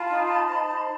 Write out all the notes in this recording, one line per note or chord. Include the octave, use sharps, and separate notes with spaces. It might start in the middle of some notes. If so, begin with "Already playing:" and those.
Already playing: F4 A5 B5
D#4
C5